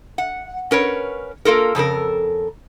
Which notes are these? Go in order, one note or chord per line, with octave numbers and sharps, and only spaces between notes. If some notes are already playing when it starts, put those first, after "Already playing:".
F#5
C#4 A#4 B4 C#5
A#3 F4 A4 A#4
F2 C#3 A4 A#4